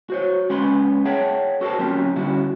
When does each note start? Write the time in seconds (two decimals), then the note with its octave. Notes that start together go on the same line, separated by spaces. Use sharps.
0.10 F#4 C5 C#5
0.50 G#3 B3 C#4 B5 C6
1.05 G#4 C#5 E5 F#5 G5 A5
1.61 F#4 A4 A#4 C5 A5
1.79 F#3 A#3 C4 C#4 F4 G4
2.16 D3 G3 C#4 E4 F#4